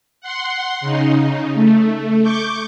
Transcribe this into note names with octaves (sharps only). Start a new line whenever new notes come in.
F#5 C6
C#3 D#4
A3
C#6 D6 G6